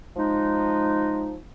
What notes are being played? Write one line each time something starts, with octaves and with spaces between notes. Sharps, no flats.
F3 G#3 D#4